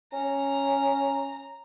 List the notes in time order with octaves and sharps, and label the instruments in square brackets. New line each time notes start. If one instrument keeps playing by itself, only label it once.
[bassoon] C#4 [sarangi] A#5